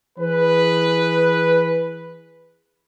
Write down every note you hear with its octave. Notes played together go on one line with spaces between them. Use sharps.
E3 G#4 B4